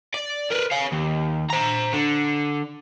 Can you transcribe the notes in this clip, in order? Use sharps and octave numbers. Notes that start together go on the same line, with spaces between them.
D5
A#4 B4
C#5 F5
D#2
C5 A#5
D3